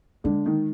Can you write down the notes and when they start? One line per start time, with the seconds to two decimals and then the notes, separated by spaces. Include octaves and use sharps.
0.24 D3 G#3
0.46 D#3